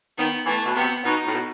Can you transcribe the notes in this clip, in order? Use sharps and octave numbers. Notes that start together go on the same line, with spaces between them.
D#3 B3
E3 A3
B2
C3 B3
B2 D#4
A2
B2